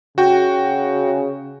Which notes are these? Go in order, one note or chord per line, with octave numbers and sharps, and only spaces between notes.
C#3 F#4 G5